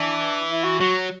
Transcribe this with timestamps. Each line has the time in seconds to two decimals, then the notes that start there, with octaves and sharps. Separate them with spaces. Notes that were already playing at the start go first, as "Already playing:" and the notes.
Already playing: E3 D4
0.50 E4
0.64 F#4
0.80 F#3 F#4